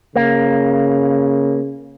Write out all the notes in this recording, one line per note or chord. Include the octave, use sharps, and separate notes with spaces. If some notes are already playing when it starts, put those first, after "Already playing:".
C#3 A#3